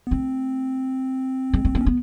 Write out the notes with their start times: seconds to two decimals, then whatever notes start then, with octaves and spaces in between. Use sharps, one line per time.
0.07 B3
0.11 A3 C4
1.54 G#3
1.65 A3
1.75 A#3
1.81 C#4
1.86 B3